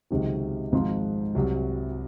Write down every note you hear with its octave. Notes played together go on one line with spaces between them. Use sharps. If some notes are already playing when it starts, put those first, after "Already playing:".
C#2 C3 D#3 F#3
G#1 G#2 F3 C4 F4
C2 C3 F#3